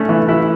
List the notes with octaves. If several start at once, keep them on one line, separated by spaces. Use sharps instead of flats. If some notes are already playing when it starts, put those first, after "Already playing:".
Already playing: A3 C#4 D4
E3
E4